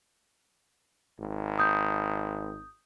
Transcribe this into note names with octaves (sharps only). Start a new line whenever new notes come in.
G#1
D#6 G6